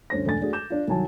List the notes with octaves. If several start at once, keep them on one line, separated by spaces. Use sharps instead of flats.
G1 D2 C#4 C5 A#6
E1 A3 D4 G#5 A6
A3 D4 F#4 G#4
D6 G6 E7
D4 F4
C2 D#3 F#3 G#5 A5